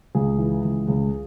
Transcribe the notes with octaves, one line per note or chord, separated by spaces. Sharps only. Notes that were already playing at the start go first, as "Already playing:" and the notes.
C#2 G#4
E3
C#2
C#2